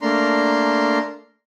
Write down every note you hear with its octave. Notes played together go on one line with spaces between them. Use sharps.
A3 A#3 D4 A#5 C6